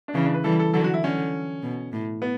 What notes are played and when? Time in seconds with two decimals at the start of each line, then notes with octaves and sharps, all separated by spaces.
0.08 D4
0.14 C#3 E3 C#4
0.25 D4
0.34 B4
0.44 E3 G3 A4
0.59 A4
0.73 D3 F#3 A4
0.84 F#4
0.94 E4
1.04 D3 C#4
1.63 B2
1.93 A2
2.22 B3